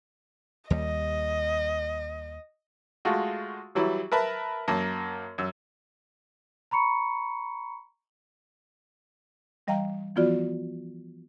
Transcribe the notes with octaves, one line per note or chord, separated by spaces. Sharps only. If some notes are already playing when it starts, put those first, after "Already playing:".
D#2 G3 D#5
G#3 A3 F4 F#4
E3 F#3 G3 E4
A#4 B4 E5 A5 B5
F#2 A#3 A#4 A5
F#2 E6
A#5 B5 C#6 C#7
E3 G3 D#5 F5 G5 A#5
E3 F3 B3 F4 F#4 D5